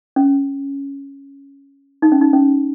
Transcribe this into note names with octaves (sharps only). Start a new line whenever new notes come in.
C#4
D#4
C#4
D#4
C#4